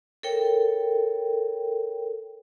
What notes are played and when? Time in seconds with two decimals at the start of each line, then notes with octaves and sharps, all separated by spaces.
0.23 A4 A#4 C#5 G5